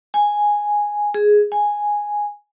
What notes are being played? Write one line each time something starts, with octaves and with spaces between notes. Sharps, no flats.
G#5
G#4
G#5